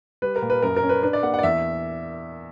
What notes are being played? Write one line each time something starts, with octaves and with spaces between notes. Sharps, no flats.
G3 B4
A#4
A#2
B4
F#2 A#4
A#4
C#4
B4
D4 B4
D5
A#3 F#5
F#5
D5
E2 E5